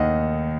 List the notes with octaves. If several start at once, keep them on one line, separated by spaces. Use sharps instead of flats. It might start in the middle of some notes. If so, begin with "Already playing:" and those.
Already playing: D#2 D#3 D#5 F#5